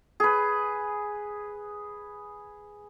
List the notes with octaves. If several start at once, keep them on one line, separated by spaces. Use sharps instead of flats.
G#4 B4